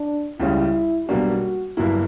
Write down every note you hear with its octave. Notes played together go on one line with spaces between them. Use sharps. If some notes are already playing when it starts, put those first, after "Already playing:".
Already playing: D4
C#2 C#3 G3 C#4 E4
B1 B2 G3 A#3 D4 F#4
G1 G2 F#3 A#3 E4